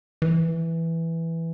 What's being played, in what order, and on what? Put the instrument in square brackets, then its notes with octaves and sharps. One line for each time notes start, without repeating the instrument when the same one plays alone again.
[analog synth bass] E3